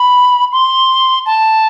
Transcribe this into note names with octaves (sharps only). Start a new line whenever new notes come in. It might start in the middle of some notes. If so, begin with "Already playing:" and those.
Already playing: B5
C6
A5